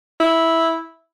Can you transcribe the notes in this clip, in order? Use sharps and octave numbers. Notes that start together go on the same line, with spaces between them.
E4